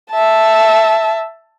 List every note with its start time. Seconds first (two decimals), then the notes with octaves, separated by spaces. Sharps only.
0.11 E5 A5